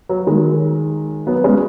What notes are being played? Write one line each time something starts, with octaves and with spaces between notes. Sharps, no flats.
F#3
D#3 G#3
F#3 B3
G#3 C#4